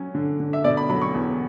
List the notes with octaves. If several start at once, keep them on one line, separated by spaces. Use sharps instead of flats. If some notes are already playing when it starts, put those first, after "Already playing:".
Already playing: F#3 C#4
D3
D3
E5
B2 D5
B5
F#3 B5
C#6
E2